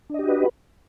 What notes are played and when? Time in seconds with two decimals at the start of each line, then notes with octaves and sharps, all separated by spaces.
0.09 D4
0.14 D#5
0.19 G4
0.24 F#4
0.28 B4